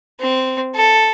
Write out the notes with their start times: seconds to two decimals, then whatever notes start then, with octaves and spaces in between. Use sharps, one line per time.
0.20 C4
0.75 A4